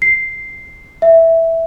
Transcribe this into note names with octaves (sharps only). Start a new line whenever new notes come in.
C7
E5